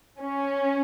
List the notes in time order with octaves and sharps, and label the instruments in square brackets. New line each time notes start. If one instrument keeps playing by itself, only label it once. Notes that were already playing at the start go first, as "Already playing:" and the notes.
[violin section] C#4